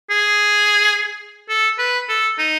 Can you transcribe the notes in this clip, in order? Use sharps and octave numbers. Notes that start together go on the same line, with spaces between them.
G#4
A4
B4
A4
D#4